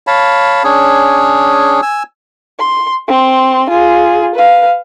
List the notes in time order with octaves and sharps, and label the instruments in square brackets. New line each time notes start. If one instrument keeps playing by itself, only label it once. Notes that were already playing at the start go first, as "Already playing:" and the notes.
[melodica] C#5 F5 A5 B5
C#4 D4 G#4 C#5
G#5 E6
[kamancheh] C6
C4 C6
F4 G#4
B4 F5